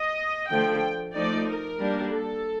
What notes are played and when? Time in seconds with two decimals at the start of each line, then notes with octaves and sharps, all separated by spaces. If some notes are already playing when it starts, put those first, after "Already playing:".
Already playing: D#5
0.50 D3 F3 A3 G5
1.15 F3 A3 D#4 D5
1.48 A#4
1.80 G3 A#3 D4
2.12 A4